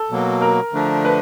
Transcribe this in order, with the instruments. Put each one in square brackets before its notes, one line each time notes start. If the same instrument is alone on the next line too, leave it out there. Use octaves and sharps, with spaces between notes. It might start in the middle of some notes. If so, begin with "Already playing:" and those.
Already playing: [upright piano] A4
[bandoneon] B2 F#3 A#3
[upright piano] A#4
[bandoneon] D3 F3 A3 D4
[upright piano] B4